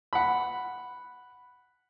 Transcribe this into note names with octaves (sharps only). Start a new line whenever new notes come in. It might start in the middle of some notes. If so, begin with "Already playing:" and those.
F#5 B5